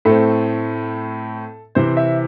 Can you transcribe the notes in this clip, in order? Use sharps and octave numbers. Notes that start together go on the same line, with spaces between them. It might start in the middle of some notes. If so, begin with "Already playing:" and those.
A2 A3 C4 A4
C3 E3 C4 C5
E5